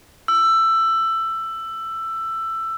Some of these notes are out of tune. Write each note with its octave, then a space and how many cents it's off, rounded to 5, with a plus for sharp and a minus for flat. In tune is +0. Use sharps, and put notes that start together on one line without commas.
E6 +15